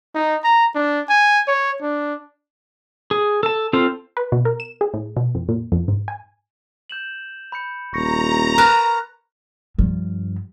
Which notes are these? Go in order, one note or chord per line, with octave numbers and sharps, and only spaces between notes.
D#4
A#5
D4
G#5
C#5
D4
G#4
A4 A5
C4 F4 A4 C5
B4
B2
A#4
E7
G#4
A2
B2
F2
A#2
F2
G#2
G#5
G6 E7 F#7
B5 G6 C#7
D#1 A#5 C#6 A#6 C#7
A#4 B4 A5
G2 F3